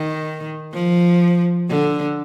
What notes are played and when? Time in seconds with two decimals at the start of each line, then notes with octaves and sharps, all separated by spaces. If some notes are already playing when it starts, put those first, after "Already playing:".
Already playing: D#3
0.73 F3
1.70 D3